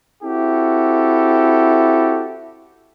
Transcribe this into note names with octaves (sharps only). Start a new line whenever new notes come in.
C4 E4 F#4 G4 A4